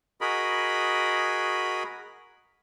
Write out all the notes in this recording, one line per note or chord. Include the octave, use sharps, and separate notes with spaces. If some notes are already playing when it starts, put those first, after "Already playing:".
F#4 G#4 A#4 D#5 B5